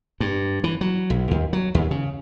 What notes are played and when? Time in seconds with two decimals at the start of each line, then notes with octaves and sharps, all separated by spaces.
0.20 G2
0.64 E3
0.81 F#3
1.10 B1
1.31 D#2
1.53 F#3
1.75 D#2
1.91 C#3